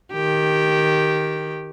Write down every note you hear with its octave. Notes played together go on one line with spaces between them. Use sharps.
D#3 G4